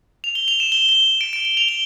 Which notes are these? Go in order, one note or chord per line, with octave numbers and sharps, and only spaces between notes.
F7
G7
F7
E7
G7
G7
D7
D7
D7
F7
G7